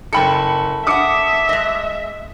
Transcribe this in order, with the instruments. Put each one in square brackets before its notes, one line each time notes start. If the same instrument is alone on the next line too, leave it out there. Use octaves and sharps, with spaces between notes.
[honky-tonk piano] F#1 B5 C#7 [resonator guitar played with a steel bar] A4 G5
[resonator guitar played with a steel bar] D4 F#5 [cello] E5 [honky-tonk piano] D6 D#6 C#7
[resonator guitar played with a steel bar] G#3 D#5